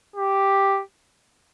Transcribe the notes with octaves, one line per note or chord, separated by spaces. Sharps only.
G4